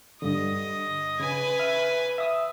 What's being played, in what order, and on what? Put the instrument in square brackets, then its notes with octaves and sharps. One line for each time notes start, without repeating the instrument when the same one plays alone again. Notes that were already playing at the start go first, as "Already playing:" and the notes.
[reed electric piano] G2 D3 [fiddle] D#5
[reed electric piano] C#3 [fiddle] B4 G#5
[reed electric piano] E5 F6
E5 D#6 E6